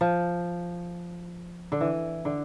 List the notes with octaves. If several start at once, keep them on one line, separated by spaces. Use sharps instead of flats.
F3
D3
E3
D3